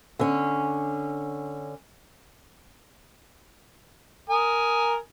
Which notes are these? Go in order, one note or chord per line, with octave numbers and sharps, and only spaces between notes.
D3 C#4
A#4 G#5 D#6